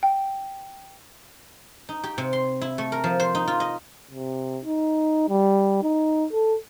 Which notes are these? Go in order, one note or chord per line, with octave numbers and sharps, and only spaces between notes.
G5
D#4
G4
C3
C6
E4
A3
A#4
F3
C5
D#4
F4
D#5
C3
D#4
G3
D#4
A4